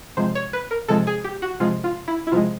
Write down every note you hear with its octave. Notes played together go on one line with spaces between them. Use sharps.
C3 F3 G#3 C5
C#5
B4
A#4
C3 F3 G#3 A4
G#4
G4
F#4
C3 F3 G#3 F4
F4
E4
E4
C3 F3 G#3 F4